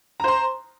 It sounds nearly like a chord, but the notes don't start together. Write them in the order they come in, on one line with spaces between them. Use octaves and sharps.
A#5 C5 C6